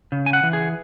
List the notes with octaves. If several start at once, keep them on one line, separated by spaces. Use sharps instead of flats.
C#3
G#5
F#5
E3
G#4